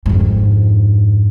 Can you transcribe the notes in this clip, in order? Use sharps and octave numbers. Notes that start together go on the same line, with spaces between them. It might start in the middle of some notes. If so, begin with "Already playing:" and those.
F2 G#2